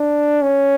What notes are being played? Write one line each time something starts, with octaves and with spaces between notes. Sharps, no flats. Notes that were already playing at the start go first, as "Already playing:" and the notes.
Already playing: D4
C#4